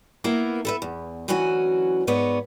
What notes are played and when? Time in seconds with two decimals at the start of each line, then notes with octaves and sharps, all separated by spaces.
0.24 A#3 B3 E4 A#4
0.65 A4 B4 E5
0.82 E2
1.28 D2 E3 F#3 C#4 F#4 G#5
2.07 G#2 G#3 B3 C#5 D5